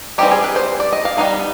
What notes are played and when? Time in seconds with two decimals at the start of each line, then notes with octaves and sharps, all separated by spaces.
0.18 E3 G3 C4 D#4 G4
0.31 G#4
0.44 B4
0.56 C5
0.80 D5
0.92 D#5
1.05 F5
1.17 G3 B3 D#4 F5